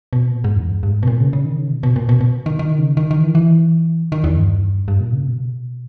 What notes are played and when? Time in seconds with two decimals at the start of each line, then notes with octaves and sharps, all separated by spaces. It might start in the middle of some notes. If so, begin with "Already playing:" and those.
0.13 B2
0.32 A#2
0.44 G#2
0.56 E2
0.69 G2
0.83 G2
0.87 G#2
1.03 B2
1.07 A#2
1.20 C#3
1.33 C#3
1.45 D#3
1.58 C#3
1.70 B2
1.83 B2
1.96 A#2
2.09 B2
2.21 B2
2.46 D#3
2.59 D#3
2.78 C#3
2.97 D#3
3.11 D#3
3.23 E3
3.35 E3
4.12 D#3
4.24 E2
4.37 G2
4.88 G2
5.00 A#2
5.13 C#3
5.26 B2